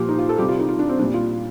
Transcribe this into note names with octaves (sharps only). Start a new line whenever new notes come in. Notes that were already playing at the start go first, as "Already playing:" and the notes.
Already playing: A#2 F3 G4
D#4
F4
A4
C3 G3 G4
F4
D#4
F4
D4
C4
A#2 G3 D4
F4